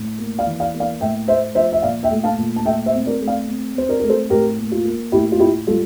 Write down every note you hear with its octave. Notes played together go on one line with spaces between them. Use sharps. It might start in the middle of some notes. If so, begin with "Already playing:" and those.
Already playing: A2
A#3
D5 F5
E3
D5 F5
A#3
D5 F5
A2 E5 G5
A3 C5 E5
F3 C5 E5
E5
A#2 D5 F5
E5 G5
A3
F5 A5
A#2
A5
A3 E5 G5
C5 E5
C4
A#4 D5
A3
D5 F5
C4
C4 C5
A#4 D5
A3 A#4
A4 C5
A2 G4 A#4
A#3
F4
A#3
A2 E4 G4
F4
A2 E4 G4
G3 F4 A4